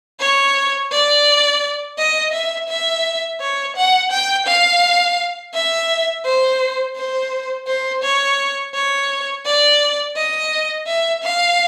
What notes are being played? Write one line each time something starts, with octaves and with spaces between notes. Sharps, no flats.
C#5
D5
D#5
E5
E5
C#5
F#5
G5
F5
E5
C5
C5
C5
C#5
C#5
D5
D#5
E5
F5